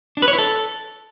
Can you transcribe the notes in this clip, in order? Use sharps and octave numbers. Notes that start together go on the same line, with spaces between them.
D4
B4
C#5
E4
A4